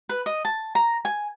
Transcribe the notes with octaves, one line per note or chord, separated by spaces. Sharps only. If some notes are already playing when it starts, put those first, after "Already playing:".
B4
D#5
A5
A#5
G#5